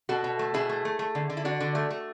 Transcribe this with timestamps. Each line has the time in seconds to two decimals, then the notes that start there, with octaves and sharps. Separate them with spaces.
0.09 B2 F#4 A4
0.24 B2
0.39 A3
0.54 B2 E4 G#4
0.69 A3
0.85 A3
0.99 A3
1.15 D3
1.30 D3
1.37 E4
1.45 D3 D4 F#4
1.60 D3
1.75 A3
1.90 A3